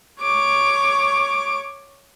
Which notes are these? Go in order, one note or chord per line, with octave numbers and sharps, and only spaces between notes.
C#5 D6